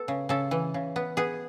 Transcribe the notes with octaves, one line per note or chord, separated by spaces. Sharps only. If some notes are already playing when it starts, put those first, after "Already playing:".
Already playing: B3 A4
C#3
C#3 A4
E3
C#3
B3
B3 G#4